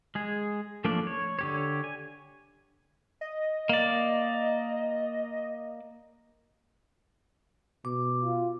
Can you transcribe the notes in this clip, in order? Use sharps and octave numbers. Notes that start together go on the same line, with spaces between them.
G#3 G#4
F3 A3 A#3 D4 D5
C#5
D3 G4 C#5
G#5
D#5
A#3 D5
B2 D6
F4